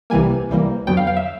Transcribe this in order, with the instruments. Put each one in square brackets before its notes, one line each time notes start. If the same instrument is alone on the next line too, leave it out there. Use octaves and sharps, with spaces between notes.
[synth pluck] C2 C3 E3 G3 A#3 G#5
C2 C3 E3 G3 A#3
F2 D3 F#3 B3 G5
F5
F5
E5